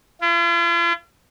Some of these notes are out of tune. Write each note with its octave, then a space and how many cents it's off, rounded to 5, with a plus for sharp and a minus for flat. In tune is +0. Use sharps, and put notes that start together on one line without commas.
F4 -45